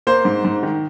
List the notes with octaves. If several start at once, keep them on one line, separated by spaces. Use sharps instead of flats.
A#3 C5
G#2
G#2
D#3